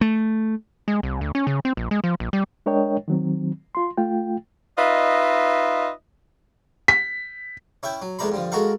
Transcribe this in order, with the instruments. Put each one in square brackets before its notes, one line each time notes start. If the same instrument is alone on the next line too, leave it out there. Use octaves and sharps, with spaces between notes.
[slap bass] A3
[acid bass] G#3
C2
D2
C#4
C#3
C4
A#1
G#3
F3
A#1
G3
[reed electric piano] G#3 D4 A#4 C#5 D#5 G5
D#3 F#3 C4
F4 C6
A3 F4 G5
[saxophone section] D#4 F4 B4 D#5 E5
[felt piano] B6
[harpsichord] C#4 E4 E5 G5
F#3
E2 G#3 A3 D4 A#5 B5
G2 D3 F3
G#3 F#4 A4 A#4 F5 F#5